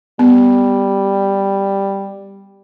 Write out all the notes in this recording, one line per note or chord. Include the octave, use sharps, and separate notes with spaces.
G3 B3